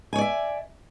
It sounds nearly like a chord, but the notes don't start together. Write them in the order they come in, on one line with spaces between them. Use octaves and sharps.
G#5 C#5 D5 E5